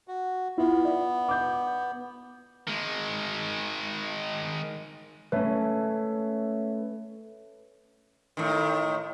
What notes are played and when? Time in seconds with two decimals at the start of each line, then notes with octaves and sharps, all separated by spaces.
0.08 F#4
0.58 B3 E4 F4
0.84 D5
1.29 D6 G6
2.67 D#3 G#3
5.32 A3 C#4 B4 C#5 E5
8.37 A2 D#3